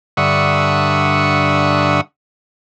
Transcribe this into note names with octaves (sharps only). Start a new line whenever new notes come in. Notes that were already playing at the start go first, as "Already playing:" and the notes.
G2 D3 E5 F#5 C#6 D#6